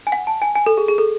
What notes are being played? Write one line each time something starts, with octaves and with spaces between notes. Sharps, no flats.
G#5
F#5
A5
G#5
G#5
A4
G#4
G#4
A4